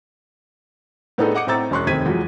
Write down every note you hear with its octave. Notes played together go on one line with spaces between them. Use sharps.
A2 B3 D4 D#4 G#4 A4
D#5 F#5 D6 C#7
A2 A3 C4 A#5 E6 A6
E1 C#4 C6 C#6 F#6
F1 D#2 C4 G#6 B6 D#7
E2 F3 F#3 G#3